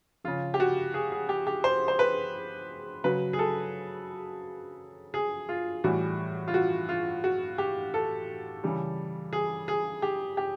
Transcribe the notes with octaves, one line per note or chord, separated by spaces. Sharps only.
C#3 F3 F4
G4
F#4
G#4
G#4
G4
G4
C5
C5
B4
C#3 F#3 B4
G#4
A4
G#4
F4
A2 E3 G3 F#4
F4
F#4
F4
F#4
G4
A4
C#3 E3 G3
G#4
G#4
G4
G4